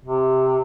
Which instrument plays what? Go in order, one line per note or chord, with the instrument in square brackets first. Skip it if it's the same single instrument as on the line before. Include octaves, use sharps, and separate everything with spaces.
[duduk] C3